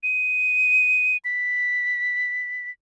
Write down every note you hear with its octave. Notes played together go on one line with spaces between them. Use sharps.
D#7
B6